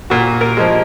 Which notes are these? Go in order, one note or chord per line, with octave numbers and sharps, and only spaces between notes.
A#2 F#4
A#4
F3 G#3